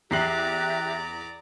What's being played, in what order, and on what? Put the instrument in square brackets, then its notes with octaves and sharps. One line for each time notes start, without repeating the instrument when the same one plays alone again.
[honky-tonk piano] E2 C7 F#7 [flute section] G4 E5 F#6 [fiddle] D5 A#5